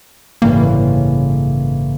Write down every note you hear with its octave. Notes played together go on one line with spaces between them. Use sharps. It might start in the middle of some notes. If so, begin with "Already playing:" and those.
A1 G2 C#3 A#3